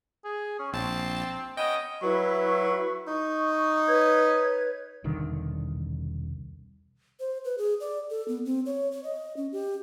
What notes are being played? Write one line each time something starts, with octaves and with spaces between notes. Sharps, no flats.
G#4
C#4
A#1 C4 A5
B3 C#4 D#5 G5
F#3 E4 B4 C#6
D#4 C#6
B4 C#5 G#6
E1 C2 D3 D#3
C5
B4
G#4
D5
A4
B3
C4
C#5
C#5
D#5
C#4
G4